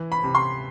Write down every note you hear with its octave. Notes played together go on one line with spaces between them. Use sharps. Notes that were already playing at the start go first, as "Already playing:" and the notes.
Already playing: E3
B5
C3
C6